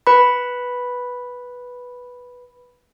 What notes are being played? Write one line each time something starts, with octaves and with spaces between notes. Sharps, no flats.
B4 B5